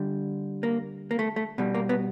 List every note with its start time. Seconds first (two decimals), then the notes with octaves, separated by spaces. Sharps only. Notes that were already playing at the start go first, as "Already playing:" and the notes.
Already playing: D3 G3
0.63 A#3
1.11 A#3
1.19 A3
1.36 A3
1.58 B2 G3
1.75 A#3
1.89 B3